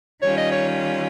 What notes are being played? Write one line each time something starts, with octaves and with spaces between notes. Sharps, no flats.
D#3 G3 C#4 F4 C#5
D#5
C#5